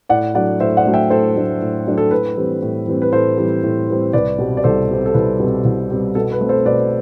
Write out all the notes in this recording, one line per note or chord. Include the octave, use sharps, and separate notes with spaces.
A2 D5 F#5
F#3 A3 D4 D5 F#5
A2 C5 E5
D5 F#5
F#3 A3 D4
E5 G5
A2 A4 C5
F#3 A3 D4
A2
F#3 A3 D4
A4
A2 B4
E3 G3 C4
A2
E3 G3 C4
B4
A2 A4 C5
E3 G3 C4
A2
E3 G3 C4
C2 B4 D5
B2 G3 C4
D5
C2 A4 C5
B2 G3 C4
A4
C2 B4
B2 G3 C4
C2
B2 G3 C4
B2 A4
B4
A3 C4
A4 C5
B2 B4 D5